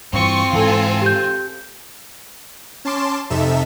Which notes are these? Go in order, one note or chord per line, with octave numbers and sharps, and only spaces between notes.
G2 E3 C4 F4 C#6
G#2 E3 A4 G#5
G4 G6
C#4 A5 C6 D6 E7
F2 C3 D#4 A4 E5 E7